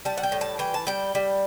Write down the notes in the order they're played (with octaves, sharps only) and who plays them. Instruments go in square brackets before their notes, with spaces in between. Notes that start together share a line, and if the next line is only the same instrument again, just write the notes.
[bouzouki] G3 A5
F#5
G5
A2
A5
E3 G5
A5
G3 G5
G3